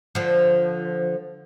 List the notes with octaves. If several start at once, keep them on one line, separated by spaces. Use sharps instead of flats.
D3 F3